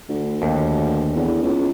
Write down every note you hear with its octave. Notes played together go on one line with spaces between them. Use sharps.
D2
D#2
E2
C#2